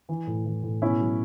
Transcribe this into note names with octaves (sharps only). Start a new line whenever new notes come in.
E3
A2
E3
A2
B2 C#4 E4
F#3